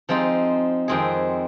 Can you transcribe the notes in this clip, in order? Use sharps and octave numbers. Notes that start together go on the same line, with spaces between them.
F3 G#3 C4 D#4
F2 D#3 G#3 C4 G#4